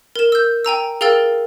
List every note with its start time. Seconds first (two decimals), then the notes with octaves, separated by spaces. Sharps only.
0.16 A#4 E7
0.32 E6 G6
0.65 G5 G#5 A#5 E6
1.01 G#4 A#4 F5 G5 E6 A6